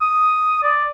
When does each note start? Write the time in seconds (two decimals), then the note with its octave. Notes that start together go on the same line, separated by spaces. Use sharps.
0.01 D#6
0.63 D5